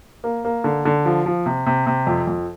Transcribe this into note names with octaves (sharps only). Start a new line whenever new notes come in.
A#3
A#3
D3
D3
F3
F3
C3
C3
C3
F2
F2